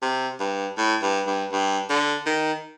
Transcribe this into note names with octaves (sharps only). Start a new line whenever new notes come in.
C3
G2
A2
G2
G2
G2
D3
D#3